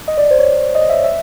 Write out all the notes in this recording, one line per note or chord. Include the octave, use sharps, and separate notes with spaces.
D#5
D5
C5
C#5
D#5
E5
E5